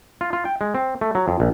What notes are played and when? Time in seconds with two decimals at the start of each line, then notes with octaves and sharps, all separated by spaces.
0.21 F4
0.33 F4
0.45 G5
0.61 G#3
0.75 C4
1.01 A3
1.15 F#3
1.28 F2
1.40 A#1